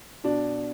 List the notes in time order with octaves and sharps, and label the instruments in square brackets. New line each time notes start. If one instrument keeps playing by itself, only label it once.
[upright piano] B2 D4